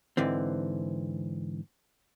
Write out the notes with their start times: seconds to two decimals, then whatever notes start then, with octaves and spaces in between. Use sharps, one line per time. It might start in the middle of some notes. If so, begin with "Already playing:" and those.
0.17 G#2 D3 E3 C4